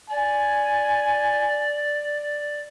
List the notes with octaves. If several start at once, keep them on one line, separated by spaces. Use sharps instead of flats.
D5 G#5